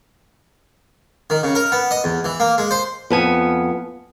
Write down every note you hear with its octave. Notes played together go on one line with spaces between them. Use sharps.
D#3
C#3
A#4
B3
D#5
E2
E3
A#3
G#3
C5
F2 B3 G#5